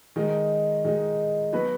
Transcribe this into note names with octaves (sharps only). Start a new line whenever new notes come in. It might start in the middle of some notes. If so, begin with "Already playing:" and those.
D#3 G#3 D#4
D#3 G#3 D#4
F#3 B3 F#4 B4